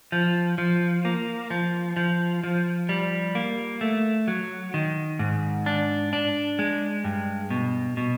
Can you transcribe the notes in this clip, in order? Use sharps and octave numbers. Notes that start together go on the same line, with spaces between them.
F3
F3
A#3
F3
F3
F3
G3
A#3
A3
F#3
D#3
G#2
D4
D4
G#3
G2
B2
B2